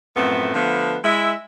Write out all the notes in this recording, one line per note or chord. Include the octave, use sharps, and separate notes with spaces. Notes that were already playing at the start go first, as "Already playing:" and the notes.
F#2 A2 F3 A3 B3 C4
D3 F3 A3 B3
G#3 E4 E5